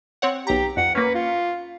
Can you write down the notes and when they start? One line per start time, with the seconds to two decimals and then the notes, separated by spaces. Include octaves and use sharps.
0.22 C4 C#5 F#5
0.47 B1 G4 A#5
0.77 F2 F#5
0.95 A#3 C#4 B4
1.15 F4